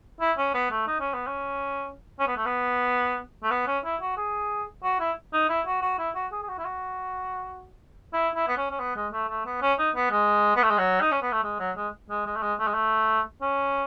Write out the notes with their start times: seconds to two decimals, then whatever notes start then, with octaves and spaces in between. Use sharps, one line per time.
0.21 E4
0.38 C#4
0.54 B3
0.71 A3
0.87 D#4
1.00 C#4
1.14 B3
1.27 C#4
2.19 C#4
2.28 B3
2.37 A3
2.46 B3
3.43 A3
3.51 B3
3.67 C#4
3.85 E4
4.02 F#4
4.17 G#4
4.84 F#4
5.00 E4
5.33 D#4
5.50 E4
5.67 F#4
5.82 F#4
5.99 E4
6.15 F#4
6.32 G#4
6.43 G#4
6.49 F#4
6.58 E4
6.65 F#4
8.14 E4
8.36 E4
8.48 B3
8.58 C#4
8.71 C#4
8.80 B3
8.96 G#3
9.13 A3
9.29 A3
9.46 B3
9.62 C#4
9.79 D#4
9.96 B3
10.11 G#3
10.56 B3
10.63 A3
10.71 G#3
10.78 F#3
11.01 D#4
11.12 C#4
11.22 B3
11.33 A3
11.44 G#3
11.60 F#3
11.77 G#3
12.10 G#3
12.26 G#3
12.36 A3
12.43 G#3
12.59 A3
12.67 G#3
12.74 A3
13.42 C#4